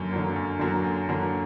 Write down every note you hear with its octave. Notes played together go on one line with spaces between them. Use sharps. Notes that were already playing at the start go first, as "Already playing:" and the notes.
Already playing: F#2 D3 F#3 A#3
D3 F#3 A#3
F#2
D3 F#3 A#3
F#2
D3 F#3 A#3